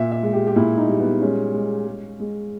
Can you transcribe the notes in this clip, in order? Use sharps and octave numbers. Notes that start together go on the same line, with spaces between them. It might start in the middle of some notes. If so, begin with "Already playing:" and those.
Already playing: A#2 E5
E5
G#3
G4
G4
A#2 E4
D#4
G3
B3
G#3 C#4
G#3
G#3
G#3